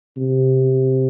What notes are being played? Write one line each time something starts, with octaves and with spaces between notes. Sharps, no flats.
C3